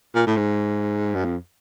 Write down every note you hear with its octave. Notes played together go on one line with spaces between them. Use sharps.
A#2
A2
G#2
F#2
F2